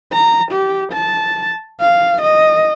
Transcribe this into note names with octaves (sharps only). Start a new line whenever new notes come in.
A#5
G4
A5
F5
D#5